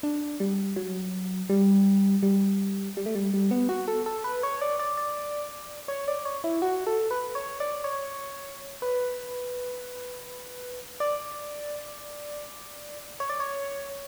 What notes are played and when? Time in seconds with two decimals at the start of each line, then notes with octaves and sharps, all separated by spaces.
0.03 D4
0.40 G3
0.76 F#3
1.49 G3
2.23 G3
2.97 G3
3.06 A3
3.15 G3
3.34 G3
3.51 B3
3.69 F#4
3.88 A4
4.06 A4
4.24 B4
4.43 C#5
4.61 D5
4.79 D5
4.97 D5
5.88 C#5
6.08 D5
6.25 C#5
6.44 E4
6.62 F#4
6.87 A4
7.11 B4
7.35 C#5
7.60 D5
7.84 C#5
8.82 B4
11.00 D5
13.20 C#5
13.30 D5
13.40 C#5